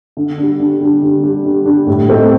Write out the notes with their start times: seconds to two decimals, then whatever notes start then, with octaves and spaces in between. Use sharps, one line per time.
0.17 D3
0.38 G3 D4
0.60 D3
0.80 G3 D4
1.02 D3
1.23 G3 D4
1.45 D3
1.66 G3 D4
1.87 A2
2.09 A3 C4 D#4 A4